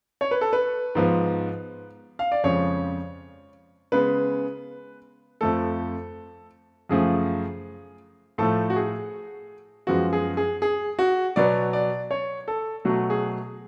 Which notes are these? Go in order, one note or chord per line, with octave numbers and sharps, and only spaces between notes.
C#5
B4
A4
B4
G#2 F3 B3
F5
D5
F2 C#3 F3 G#3 C#5
C#3 G#3 B3 B4
F2 F3 A3 A4
F#2 C#3 F3 A3 G#4
A2 F3 A3 A4
F#4
G#4
F#2 F3 G#3 B3 F#4
G#4
G#4
G#4
F#4
B2 F#3 B3 D5
D5
C#5
A4
B2 F#3 A3 F#4
G#4